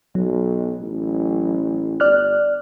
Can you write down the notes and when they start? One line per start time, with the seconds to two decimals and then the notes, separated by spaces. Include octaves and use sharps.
0.15 B1 F#3
0.81 A1
2.00 G1 D5 F6 F#6